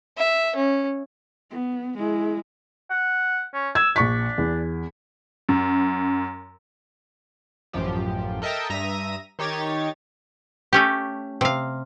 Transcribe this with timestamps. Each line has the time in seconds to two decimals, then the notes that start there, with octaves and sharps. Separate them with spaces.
0.17 E5
0.56 C#4
1.51 B3
1.97 G#3 E4
2.90 F#5
3.54 C#4
3.75 E6 G#6
3.96 A#1 D4 C#6 B6
4.38 E2
5.49 F#2
7.73 A1 F#2 F3 G4
8.42 A4 A#4 D#5 E5 G5 A5
8.70 G2 E5 A#5 D#6 A#6 D#7
9.39 D#3 D#4 G4 C#5 G#6 A6
10.73 A3 C#4 G4
11.41 C3 F5